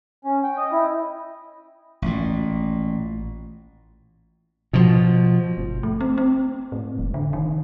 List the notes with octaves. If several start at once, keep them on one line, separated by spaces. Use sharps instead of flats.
C#4
G5
D#5
E4
A1 A#2
B2 F3
G1
A3
C4
C4
A2
F1
D3
D#3